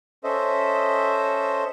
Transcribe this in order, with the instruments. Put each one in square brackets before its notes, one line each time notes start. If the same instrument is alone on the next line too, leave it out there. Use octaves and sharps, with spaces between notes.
[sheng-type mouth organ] C#4 A4 C5 D#5 E5